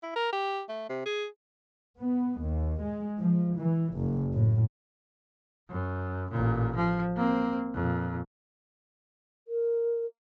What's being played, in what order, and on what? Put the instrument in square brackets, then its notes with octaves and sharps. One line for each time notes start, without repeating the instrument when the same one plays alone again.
[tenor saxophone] E4
A#4
G4
A3
C3
G#4
[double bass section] B3
D#2
G#3
F3
E3
F#1
A2
[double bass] F#2
A1 A#2
F3
A#3 C4
F2 A#2
[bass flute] A#4